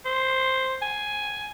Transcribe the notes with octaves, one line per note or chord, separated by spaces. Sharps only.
C5
G#5